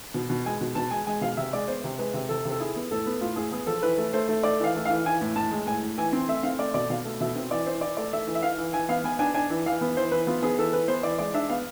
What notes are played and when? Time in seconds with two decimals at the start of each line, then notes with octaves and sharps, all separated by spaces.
0.14 B2
0.30 B2
0.46 G#3 G#5
0.61 B2
0.75 B2 A5
0.91 G#3 G#5
1.06 G#3 G#5
1.21 B2 F5
1.37 C3 E5
1.53 G#3 D5
1.68 B3 C5
1.84 C3
1.98 G#3 B4
2.14 C3
2.29 C3 A4
2.45 C3
2.51 A4
2.60 E4 G#4
2.76 B3
2.91 A2 A4
3.06 B3
3.21 A2 F4
3.36 A2 G#4
3.52 B3 G#4
3.67 F3 A4
3.82 E3 B4
3.98 A3
4.13 A3 C5
4.28 A3
4.43 A3 D5
4.60 E3 F5
4.75 A3
4.85 E3 F5
5.06 E3 G#5
5.21 A2
5.36 A2 A5
5.51 G#3
5.67 A2 G#5
5.82 A2
5.98 E3 G#5
6.13 C4
6.28 A3 E5
6.43 C4 F5
6.59 A3 D5
6.74 B2 D5
6.90 B2 F5
7.05 A3
7.20 B2 E5
7.35 C4
7.51 E3 D5
7.66 E3 C5
7.81 E4 D5
7.97 A3 D5
8.13 A3 E5
8.27 E3
8.35 E5
8.43 E3 F5
8.58 E3
8.73 E3 G#5
8.89 B3 F5
9.04 B3 G#5
9.19 D4 G#5
9.34 D4 G#5
9.50 E3
9.66 E3 F5
9.81 B3
9.97 E3 C5
10.12 E3 B4
10.27 B3 F4
10.42 B3 G#4
10.58 E3 A4
10.73 E3 B4
10.88 B3 C5
11.03 E3 D5
11.19 G#3 D5
11.34 D4 E5
11.49 B3 F5